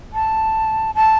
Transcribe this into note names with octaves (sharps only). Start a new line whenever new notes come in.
A5
A5